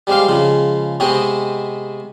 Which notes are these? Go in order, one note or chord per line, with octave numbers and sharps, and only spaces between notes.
G3 G#3 C4 G4 F5
C#3 F3 G#3
C3 G#3 B3 C4 C#5 D#5